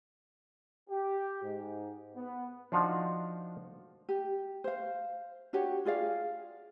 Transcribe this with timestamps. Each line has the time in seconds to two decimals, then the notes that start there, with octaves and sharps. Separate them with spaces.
0.90 G4
1.43 G#2
2.15 B3
2.72 F3 D4 D#4 F4 F#4
4.09 G4
4.64 C5 F5
5.53 D4 F#4 G4 C#5
5.85 F4 G#4 D5 F5